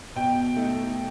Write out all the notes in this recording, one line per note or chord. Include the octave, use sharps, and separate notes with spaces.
B2 G5
A3 D#4